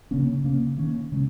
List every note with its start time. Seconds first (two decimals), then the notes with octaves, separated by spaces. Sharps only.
0.11 C#3 A#3 C#4
0.44 C#3 A#3 C#4
0.78 D#3 A#3 C#4
1.12 C#3 G#3 C#4